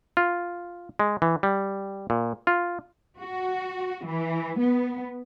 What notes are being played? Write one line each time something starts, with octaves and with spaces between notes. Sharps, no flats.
F4
G#3
E3
G3
A#2
F4
F#4
E3
B3